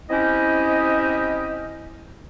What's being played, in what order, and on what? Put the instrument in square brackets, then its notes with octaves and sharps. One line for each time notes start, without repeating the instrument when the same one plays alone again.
[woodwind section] C4 C#4 E4 G4 D#5